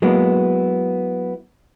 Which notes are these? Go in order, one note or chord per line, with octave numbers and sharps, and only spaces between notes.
F#3 G#3 A#3 B3 E4